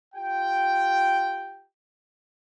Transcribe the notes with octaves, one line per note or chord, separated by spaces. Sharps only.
F4 G4 G5